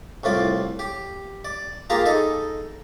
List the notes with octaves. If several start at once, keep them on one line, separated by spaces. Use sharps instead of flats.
C2 A2 F4 D5
G4
D5
A#3 F4 G4 G#4 A5 A#5
D#4 G#4 A4 D#5